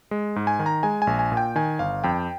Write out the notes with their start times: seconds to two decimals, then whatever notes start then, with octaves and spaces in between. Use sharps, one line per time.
0.11 G#3
0.36 G#2
0.47 G#5
0.59 D#3
0.66 A#5
0.83 G#3 G#5
1.02 G#5
1.07 A#1
1.19 G#5
1.32 A#2
1.37 G5
1.56 D#3 G#5
1.79 G1 F5
2.04 F2 G5